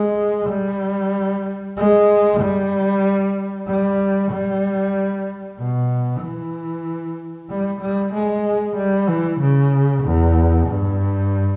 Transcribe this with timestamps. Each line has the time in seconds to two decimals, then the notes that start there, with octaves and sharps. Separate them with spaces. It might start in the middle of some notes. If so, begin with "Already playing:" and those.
Already playing: G#3
0.50 G3
1.77 G#3
2.41 G3
3.68 G3
4.32 G3
5.59 B2
6.23 E3
7.50 G3
7.82 G3
8.14 G#3
8.77 G3
9.09 E3
9.41 C#3
10.04 E2
10.68 G2